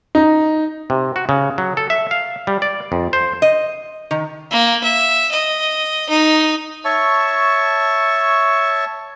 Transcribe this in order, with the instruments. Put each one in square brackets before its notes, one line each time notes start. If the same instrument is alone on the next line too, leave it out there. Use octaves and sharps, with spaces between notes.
[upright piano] D#4
[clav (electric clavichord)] C3
F#4
C#3
F#3
A4
E5
F5
G3
D5
F2
C5
[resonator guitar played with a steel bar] D#5
D#3
[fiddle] A#3
E5
D#5
D#4
[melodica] C#5 E5 A5 C#6